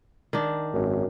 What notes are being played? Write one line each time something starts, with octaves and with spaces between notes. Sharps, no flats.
D#3 D4
G#1 F#2